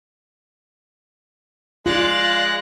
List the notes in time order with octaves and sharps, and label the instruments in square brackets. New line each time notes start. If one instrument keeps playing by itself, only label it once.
[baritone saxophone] G#3 [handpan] F4 [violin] D5 F5 [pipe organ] F#6 A#6